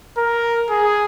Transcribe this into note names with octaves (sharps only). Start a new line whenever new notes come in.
A#4
G#4